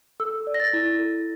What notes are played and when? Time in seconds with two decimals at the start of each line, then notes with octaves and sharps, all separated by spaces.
0.20 A4 E6
0.47 D5
0.54 A#6
0.60 A6
0.73 E4
0.99 A4